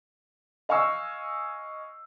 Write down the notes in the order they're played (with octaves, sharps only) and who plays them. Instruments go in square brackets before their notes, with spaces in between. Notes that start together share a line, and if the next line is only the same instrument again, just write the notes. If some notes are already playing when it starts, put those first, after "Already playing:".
[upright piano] D#5 F5 G#5 C#6 E6